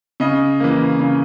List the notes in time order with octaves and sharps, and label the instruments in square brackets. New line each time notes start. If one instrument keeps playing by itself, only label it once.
[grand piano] C#3 D#5
E3 A#3
C#3